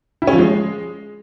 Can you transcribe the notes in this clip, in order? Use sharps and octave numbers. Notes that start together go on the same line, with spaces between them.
E4
C#4
F3
G#3